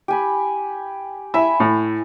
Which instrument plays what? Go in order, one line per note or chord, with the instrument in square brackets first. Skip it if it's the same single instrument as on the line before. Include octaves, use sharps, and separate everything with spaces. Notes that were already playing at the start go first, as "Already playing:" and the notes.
[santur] G4 G#5 B5
[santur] E4 G#5 B5 [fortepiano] E5
[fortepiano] A2